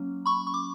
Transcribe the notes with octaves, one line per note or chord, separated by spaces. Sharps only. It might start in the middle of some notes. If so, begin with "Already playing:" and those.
Already playing: F#3 A#3 C#4
B5 C#6
C#6
D6